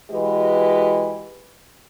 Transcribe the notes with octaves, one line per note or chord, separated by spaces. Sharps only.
E3 G#3 F#4 G4 B4 D#5